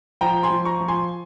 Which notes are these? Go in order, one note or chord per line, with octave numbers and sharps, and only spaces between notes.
F3 G5 A#5
G#5 C6
F3
A#5 C#6
F3
G#5 C6